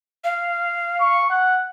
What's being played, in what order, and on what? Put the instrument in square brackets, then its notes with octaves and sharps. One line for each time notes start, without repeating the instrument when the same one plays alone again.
[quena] F5
[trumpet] C#6
F#5